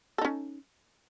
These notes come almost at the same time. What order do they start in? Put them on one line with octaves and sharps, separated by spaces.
A4 D#4 C#4